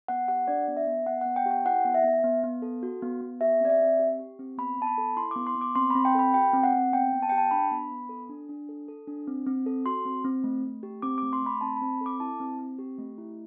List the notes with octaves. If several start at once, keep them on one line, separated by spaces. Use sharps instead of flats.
B3 F#5
G4 F#5
D4 D5
B3
E5
B3
B3 F#5
F#5
B3
G5
G4
G5
E4 F#5
B3
E5
B3
B3
B3
A4
F#4
B3
B3
G4 E5
C4 D5
E5
C4
G4
G4
C4
B3 B5
B3 A5
B5
A4
E4 C6
D6
B3
C6
B3
D6
C4 C6
B5
C4
G5
A4 B5
F#4 G5
C4
F#5
C4
B3 G5
B3
A5
G4 G5
A5
D4 B5
B3
B3
A4
D4
D4
A4
A4
D4
C4
C4
A4
F#4 C6
C4
C4
A3
A3
G4
C4 D6
D6
A3
C6
A3 B5
C4 A5
B5
C4
A4 D6
E4 A5
C4
C4
G4
A3
E4